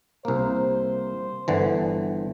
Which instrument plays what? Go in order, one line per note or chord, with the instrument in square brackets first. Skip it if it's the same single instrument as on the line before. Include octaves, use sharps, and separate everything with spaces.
[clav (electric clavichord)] C2 A#3 [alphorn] C5
[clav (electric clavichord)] G1 D3 E3